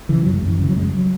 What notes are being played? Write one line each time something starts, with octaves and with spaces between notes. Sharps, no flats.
C#3 E3
F#2 F#3
G#3
F#2 E3
C#3 E3
F#3
F#2 G#3
F#3